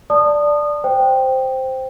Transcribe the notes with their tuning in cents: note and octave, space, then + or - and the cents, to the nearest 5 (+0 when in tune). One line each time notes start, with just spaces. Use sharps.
D5 +0 A5 +10 D#6 -25
C5 +0 G5 +0